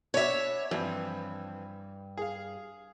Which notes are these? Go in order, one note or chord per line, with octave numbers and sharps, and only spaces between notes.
B2 D4 C#5 D5 E5
G2 E3 F3 C4
G#4 F5